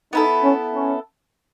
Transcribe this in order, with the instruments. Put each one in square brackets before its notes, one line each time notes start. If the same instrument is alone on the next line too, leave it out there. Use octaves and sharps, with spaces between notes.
[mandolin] B3 E4 A4 [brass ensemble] D#4
[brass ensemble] C#4
C#4